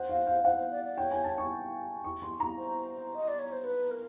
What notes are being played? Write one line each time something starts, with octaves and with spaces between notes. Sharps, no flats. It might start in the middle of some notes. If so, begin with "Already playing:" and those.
Already playing: C5 F#5
F5
F5
C5 F#5
C5
D5
D5
C#5 G5
G#5
A5
C#6
C#6
C6
A#5
C5
D#5
D5
C#5
C5
B4
A#4